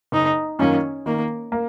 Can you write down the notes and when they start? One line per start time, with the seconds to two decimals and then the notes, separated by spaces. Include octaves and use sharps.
0.12 F#1 D#4
0.59 F#2 D#3 A#3 C#4 F4
1.06 D#3 A#3
1.52 A#3